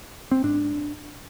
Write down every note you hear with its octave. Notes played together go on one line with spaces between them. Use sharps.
C4
G#2 D4